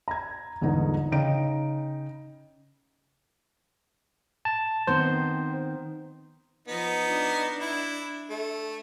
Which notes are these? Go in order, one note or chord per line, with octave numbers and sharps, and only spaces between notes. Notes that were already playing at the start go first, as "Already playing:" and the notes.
A#5 G#6
G1 E2 G#2 D3 D#4 B4
C#3 D#4 G5 D7
A5
D#3 B3 C4 C5
F3 B3 D#4
D4
E4
A3